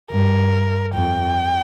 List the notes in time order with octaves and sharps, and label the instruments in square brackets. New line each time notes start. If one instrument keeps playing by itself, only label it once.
[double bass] G2 [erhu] A#4
[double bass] F2 [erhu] G5